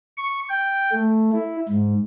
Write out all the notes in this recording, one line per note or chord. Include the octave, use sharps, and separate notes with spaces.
C#6
G5
A3
E4
G#2